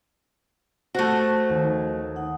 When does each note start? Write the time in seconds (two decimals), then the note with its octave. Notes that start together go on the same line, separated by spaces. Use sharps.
0.95 A3 F#4 C5
1.49 D#2
2.16 D#4 F#5